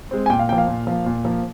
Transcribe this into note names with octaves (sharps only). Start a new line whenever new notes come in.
G#3 C4
G#5
A#2 G5
F5
F3 A#3 G5
F5
A#2
F3 A#3
A#2
F3 A#3